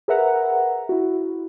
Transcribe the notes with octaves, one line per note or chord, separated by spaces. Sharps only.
G#4 A#4 B4 E5 F#5 A#5
E4 F#4